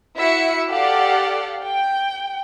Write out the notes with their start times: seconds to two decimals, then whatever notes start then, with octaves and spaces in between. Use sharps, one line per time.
0.16 E4 F#4 E5 C#7
0.69 G4 A4 D5 F5 F#5
1.63 G5